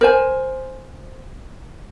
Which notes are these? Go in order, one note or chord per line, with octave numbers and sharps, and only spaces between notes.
A#4 C5 G#5